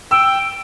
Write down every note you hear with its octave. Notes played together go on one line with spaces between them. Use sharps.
G5 E6